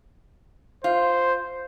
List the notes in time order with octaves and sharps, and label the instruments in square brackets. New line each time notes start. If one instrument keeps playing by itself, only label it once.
[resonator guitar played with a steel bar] F4 [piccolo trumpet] C5